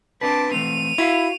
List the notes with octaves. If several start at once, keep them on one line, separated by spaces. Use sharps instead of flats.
C4 D4 B4 A5 D6
E3 A3 C4 D#7 F7
E4 F#4 E5 F5